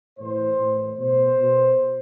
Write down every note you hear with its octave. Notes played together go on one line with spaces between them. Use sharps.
A2 E3 C5
A2 E3
B2 C5
B2